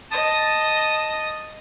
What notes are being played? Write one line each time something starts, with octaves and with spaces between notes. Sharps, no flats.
D#5 A5 D#6